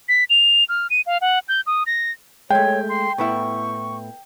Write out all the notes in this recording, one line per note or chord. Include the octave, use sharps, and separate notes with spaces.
B6
F7
F6
D#7
F5
F#5
G6
D#6
A#6
G#3 A3 C#5 G5
C6
A2 B3 E4 C#6